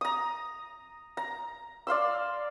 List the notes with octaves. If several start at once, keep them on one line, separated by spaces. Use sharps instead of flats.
A#5 D#6
A#5
D5 F5 C6 E6